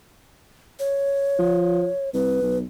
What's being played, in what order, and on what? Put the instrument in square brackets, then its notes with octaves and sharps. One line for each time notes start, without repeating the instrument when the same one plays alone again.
[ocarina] C#5
[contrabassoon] F3
[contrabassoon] C2 [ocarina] B4
[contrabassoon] B1